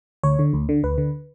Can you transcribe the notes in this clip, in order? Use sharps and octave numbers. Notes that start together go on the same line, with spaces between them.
D2 C#5
D3
D2
D3
D2 B4
D3